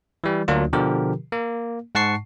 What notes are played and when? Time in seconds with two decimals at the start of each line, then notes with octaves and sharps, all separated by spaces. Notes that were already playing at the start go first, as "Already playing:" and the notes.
0.24 E3 G3
0.48 D2 F#3 A#3 D4 F4
0.73 B2 D3 F3 G4 A#4
1.32 A#3
1.95 G#2 F#5 A5 C#6 C7